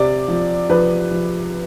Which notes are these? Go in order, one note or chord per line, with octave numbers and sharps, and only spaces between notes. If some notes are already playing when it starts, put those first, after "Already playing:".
Already playing: C3 D5
F3
F3 B4
F3